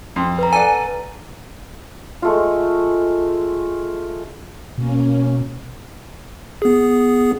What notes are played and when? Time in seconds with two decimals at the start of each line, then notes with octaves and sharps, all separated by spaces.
0.16 F2 C6
0.39 B4 A#5
0.53 A4 D5 F#5 G#5
2.22 G#3 A3 F4
4.78 B2 A#3 C#4
6.62 B3 G#4